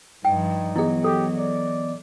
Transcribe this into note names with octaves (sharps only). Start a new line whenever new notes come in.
G2 F3 D#4 G5
E3 F#3 B3 E4 G#4 D#5
G4 A4
D5